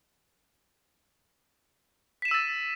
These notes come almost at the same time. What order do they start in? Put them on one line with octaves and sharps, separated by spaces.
B6 E7 D#7 E6 A6